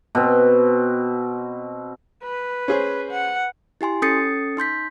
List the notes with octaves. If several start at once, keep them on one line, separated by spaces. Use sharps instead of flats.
B2 C4
B4
C#4 G#4 C5
F#5
E4 G4 G#5 C6
C#4 A4 D#6 A6 C7 C#7
D#4 C6 G6 B6